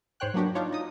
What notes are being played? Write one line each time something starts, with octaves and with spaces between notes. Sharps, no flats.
G#2 C5 C#5 G5 F#6
F#3 A#3 B3 D4 F#4 G4
D4 D#4 F4 C#5
D#4 D#6